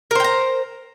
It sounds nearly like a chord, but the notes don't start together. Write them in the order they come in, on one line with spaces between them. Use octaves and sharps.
A#4 C5 G5 A#5